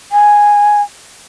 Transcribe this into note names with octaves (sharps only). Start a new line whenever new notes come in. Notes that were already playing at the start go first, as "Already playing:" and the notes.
G#5